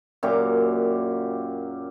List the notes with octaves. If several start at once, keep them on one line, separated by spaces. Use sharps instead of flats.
F#2 A#2 G4 D6